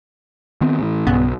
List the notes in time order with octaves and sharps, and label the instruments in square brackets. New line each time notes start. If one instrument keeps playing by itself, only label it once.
[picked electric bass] D#3 B3 C4
A2 E3
[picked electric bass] B1 [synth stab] G2 C#3 B3